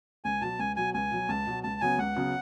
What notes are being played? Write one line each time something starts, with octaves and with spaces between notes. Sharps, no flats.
C#2 G#5
B2 F#3 A5
C#2 G#5
B2 F#3 G#5
C#2 G#5
B2 F#3
C#2 A5
B2 F#3
C#2 A5
C#3 F#3 B3 G#5
C#2 F#5
C#3 F#3 B3